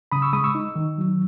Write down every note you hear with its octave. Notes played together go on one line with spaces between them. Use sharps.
C#3 B5 D#6
C#6 E6
G#3 B5 D#6
C#6 E6
D#4
D#3
F#3